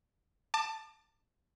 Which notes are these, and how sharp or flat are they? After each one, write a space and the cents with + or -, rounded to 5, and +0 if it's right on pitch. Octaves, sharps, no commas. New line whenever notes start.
A5 +10 D6 +35